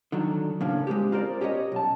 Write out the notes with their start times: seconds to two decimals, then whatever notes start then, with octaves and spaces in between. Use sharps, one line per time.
0.12 D3 D#3 F#3 D4
0.61 A2 C#3 A#3 C#4 D4
0.87 G#3 A3 C4 G4
1.12 F4 A#4 C5 D5
1.41 C#4 G4 G#4 B4 C#5 D#5
1.72 B1 A5